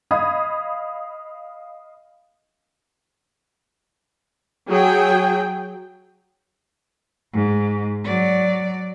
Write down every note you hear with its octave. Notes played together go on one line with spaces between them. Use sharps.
D#5 F5 B5 D#6 G#6
F#3 G#4 G5
G#2
F#3 D5